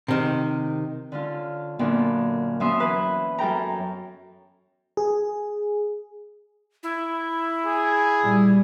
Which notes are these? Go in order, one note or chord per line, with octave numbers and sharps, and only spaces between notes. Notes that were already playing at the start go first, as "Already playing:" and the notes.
C3 D#3
D3 C#4 F4
F#2 A#2 D3 B3 D4
F#2 B3 C#4 E5 C6 D#6
E3 B4
F#2 A4 G5 A#5
G#4
E4
G#4
A#2 G3